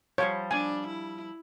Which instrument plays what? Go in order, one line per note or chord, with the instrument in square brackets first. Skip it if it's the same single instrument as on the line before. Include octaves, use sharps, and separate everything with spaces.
[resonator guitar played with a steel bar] F3 G3 C5 [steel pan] C#5
[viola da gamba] D4 [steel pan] G#5
[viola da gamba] E4